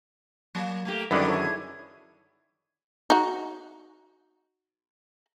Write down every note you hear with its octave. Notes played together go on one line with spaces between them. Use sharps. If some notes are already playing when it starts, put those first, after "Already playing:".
F#3 A#3
A3 A#3 G4
F#2 D3 D#3 G3 E4 B4 D5
E4 G#4 A4 C#5 E5
D#4 F#4